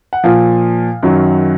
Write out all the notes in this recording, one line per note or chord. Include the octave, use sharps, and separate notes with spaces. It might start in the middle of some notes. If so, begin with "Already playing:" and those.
F#5
A#2 F3 F5
F#2 D#3 F#3